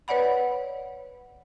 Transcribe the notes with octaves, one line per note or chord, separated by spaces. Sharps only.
B4 C#5 D5 F#5 B5